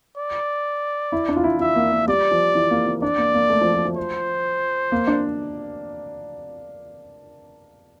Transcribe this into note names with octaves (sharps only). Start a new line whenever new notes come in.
D5
E4
D4
F4
E4
F4 E5
A#3
A#3
G3 D5
F3
E3
A#3
A#3
D4 D5
A#3
A#3
A3
F3
F3
F3
C5
A#3
D4